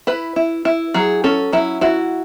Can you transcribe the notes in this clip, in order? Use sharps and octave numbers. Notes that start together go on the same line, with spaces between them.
E4 B4
E4
E4
F#3 G#4
C#4 A4
F#3 E4
E4 F#4